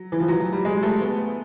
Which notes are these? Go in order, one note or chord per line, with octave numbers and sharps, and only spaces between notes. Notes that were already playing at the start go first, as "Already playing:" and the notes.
Already playing: F#3
E3
F3
F#3
F#3
G3
G#3
A3
B3